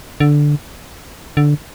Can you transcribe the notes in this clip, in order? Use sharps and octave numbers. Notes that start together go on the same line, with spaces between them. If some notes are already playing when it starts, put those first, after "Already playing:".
D3
D3